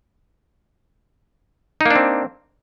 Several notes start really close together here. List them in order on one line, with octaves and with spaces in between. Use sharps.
D#4 A#3 D4 C4